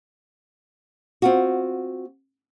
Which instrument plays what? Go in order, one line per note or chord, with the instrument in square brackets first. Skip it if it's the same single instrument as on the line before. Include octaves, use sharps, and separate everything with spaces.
[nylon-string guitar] C4 F4 F#4